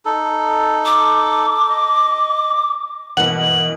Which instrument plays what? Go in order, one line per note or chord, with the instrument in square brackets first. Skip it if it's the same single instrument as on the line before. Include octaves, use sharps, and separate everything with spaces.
[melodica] D#4 A4
[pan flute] D6
[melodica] D#5
[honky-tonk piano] B2 A#3 [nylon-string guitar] E3 E4 B4 [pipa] F#5 [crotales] F#7